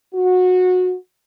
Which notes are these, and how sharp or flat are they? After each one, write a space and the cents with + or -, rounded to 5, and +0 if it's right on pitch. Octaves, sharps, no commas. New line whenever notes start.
F#4 -20